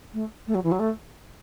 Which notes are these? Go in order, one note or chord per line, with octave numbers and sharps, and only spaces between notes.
A3
A3
F#3
E3
F#3
A3